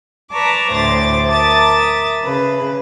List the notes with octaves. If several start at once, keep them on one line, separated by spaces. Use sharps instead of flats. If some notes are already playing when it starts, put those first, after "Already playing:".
B4 D5 A5 A#5 C#6 D6
D2 A2 C5 D6 A6
A#4 E5 A5 D6 D#6 A6
C#3 B4